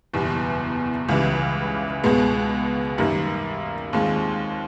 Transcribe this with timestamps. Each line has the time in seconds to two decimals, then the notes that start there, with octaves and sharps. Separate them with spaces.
0.13 F#1 E2 B2 G3
1.09 C#2 C#3 E3 G3
2.04 C#2 B2 G#3 B3
2.98 F#2 D#3 G3 A#3
3.93 D#2 D#3 G#3 C4 F4